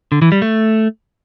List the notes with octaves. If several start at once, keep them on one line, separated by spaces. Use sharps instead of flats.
D3
E3
G3
A3